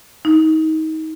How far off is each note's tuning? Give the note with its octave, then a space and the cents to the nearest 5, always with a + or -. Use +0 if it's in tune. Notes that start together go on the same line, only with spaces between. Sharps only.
D#4 +25